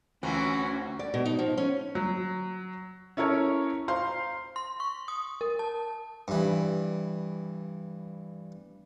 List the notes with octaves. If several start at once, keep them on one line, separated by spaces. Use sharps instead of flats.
D2 E3 C4 C#4 F4 F#4 A#5
D5
B2
D#4
F3
C#4
F#3
C#4 E4 A4 A#4 C#5
C5 F5 A#5 C6
C6
C#6
D#6
A#4
A5
G2 E3